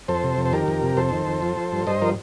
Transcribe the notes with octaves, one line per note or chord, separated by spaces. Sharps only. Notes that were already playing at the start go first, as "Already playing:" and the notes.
F2 A4 C5
C3
F2
C5
D#3 G4 A#4
F2
C3
F2 A4 C5
D#3
F2
F3
F3
G2
G2 C5 D#5
F3 A#4